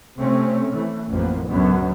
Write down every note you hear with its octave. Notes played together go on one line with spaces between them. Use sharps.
C3 A3 C4 C#4
E3 A3
A1 F2 F3 A#3 B3
C#2 F#2 D3 F#3 B3